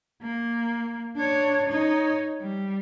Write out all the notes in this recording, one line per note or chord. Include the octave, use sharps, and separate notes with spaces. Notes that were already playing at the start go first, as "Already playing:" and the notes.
A#3
D4 C#5
D#4 C#5
G3